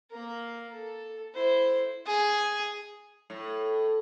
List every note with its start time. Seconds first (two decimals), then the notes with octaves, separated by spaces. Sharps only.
0.12 A#3 A#4
0.73 A4
1.34 E4 C5
2.07 G#4
3.30 A2